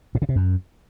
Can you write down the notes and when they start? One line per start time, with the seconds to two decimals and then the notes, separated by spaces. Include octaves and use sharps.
0.15 A2
0.22 C#3
0.29 C3
0.36 F#2